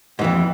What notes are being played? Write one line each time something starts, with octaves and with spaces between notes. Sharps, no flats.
F2 G#2 E3